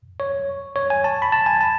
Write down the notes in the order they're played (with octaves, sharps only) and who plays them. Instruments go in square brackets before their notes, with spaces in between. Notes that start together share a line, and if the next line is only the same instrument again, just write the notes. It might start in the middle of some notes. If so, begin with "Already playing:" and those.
[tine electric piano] C#5
C#5
G#5
A5
B5
A5
G#5
A5